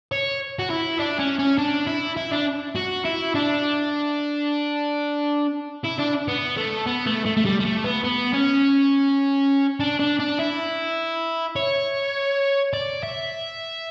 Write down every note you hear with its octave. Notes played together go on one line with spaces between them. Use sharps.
C#5
F#4
E4
D4
C#4
C#4
D4
E4
E4
D4
F#4
E4
D4
E4
D4
B3
A3
B3
A3
A3
A3
G3
G3
A3
B3
B3
C#4
D4
D4
D4
E4
C#5
D5
E5